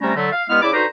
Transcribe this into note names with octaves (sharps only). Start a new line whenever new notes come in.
C3 G3 A3 C#4 A#5
D3 F#3 A3
F5
G2 G#3 B3 E4 F6
C#3 E4 D5 D6
D3 D#4 F#4 B4 C5 A#5